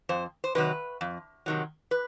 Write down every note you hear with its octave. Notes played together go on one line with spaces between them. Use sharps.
F2 C5
C5
C3 D#3 F#3 B4
F2
C3 D#3 F#3
B4